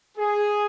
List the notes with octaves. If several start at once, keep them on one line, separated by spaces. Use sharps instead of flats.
G#4